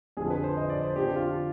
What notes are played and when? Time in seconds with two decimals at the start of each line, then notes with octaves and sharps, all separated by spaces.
0.17 F2 D3 F3 G#4
0.30 B4
0.44 C5
0.57 D#5
0.70 D5
0.83 C5
0.96 F2 D3 F3 G4
1.16 F4